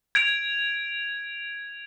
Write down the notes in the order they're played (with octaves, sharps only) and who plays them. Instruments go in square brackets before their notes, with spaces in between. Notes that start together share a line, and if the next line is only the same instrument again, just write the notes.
[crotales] G#6 D7 F7